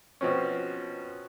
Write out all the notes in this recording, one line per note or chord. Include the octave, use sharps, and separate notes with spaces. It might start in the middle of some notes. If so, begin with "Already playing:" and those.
B2 F3 C4 C#4